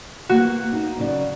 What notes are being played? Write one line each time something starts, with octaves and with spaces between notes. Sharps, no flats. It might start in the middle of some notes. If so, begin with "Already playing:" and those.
A#3 B3 F#4 F5
D#4 F5
F#2 C#3 D5